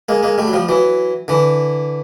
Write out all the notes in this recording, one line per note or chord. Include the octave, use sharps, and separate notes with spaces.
G#3 A#3
G#3 A#3
G3 A3
F#3
F3 G3
E3 F#3
D3 E3